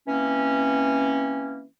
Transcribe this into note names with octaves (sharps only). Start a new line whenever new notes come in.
E3 A#3 C4 C#4